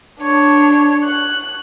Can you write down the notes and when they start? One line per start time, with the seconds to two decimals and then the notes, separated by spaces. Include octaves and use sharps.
0.21 D4 C#5
1.04 F#6